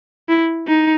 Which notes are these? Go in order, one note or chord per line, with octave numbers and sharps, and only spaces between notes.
E4
D#4